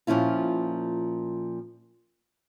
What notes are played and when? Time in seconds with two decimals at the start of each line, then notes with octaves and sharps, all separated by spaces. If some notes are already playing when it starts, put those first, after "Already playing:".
0.07 A#2 F3 C#4 E4 F4